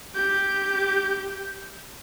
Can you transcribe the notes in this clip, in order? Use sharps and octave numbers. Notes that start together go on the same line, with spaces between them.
G4 G6